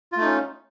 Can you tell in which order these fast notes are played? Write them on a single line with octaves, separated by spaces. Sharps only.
F4 A3 D#4 C#4